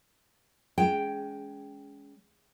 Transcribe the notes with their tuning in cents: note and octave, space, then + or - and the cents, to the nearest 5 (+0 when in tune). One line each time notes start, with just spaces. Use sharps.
G#3 +5 C#4 +25 G5 +0